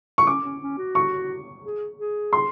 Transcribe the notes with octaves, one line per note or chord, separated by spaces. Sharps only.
C#6
C#4 D6
C#4
C#4
F#4
C#6
G#4
G#4
C6